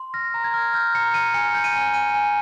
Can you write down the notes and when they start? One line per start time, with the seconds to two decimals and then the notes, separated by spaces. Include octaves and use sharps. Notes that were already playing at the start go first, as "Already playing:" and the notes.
Already playing: C6
0.14 F6 A#6
0.34 A#5
0.44 G#6
0.54 F6
0.74 F6 G6
0.95 A#5 C#7
1.14 F6 D#7
1.34 G#5 C#7
1.55 G6
1.64 D#7
1.75 G#5
1.94 G#5 D#7
2.14 G#5